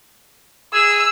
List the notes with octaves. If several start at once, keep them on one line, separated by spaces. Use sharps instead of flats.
G#4 E6